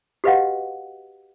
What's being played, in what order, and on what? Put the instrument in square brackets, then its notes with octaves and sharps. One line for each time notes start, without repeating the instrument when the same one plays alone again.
[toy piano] F#4 G4 B4 D#5 F5 F#5